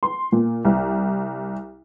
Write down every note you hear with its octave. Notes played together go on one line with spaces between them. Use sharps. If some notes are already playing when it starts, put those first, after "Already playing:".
C6
A#2
C2